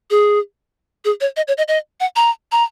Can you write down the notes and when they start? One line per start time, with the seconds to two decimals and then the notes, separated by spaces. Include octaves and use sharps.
0.10 G#4
1.05 G#4
1.21 C#5
1.37 D#5
1.48 C#5
1.58 D#5
1.68 D#5
2.00 F#5
2.16 A#5
2.52 A#5